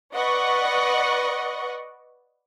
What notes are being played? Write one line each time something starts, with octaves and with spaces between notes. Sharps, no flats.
B4 D5 D#5 F#5 C#6